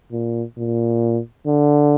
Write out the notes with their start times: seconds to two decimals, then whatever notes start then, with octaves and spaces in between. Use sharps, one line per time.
0.12 A#2
0.57 A#2
1.46 D3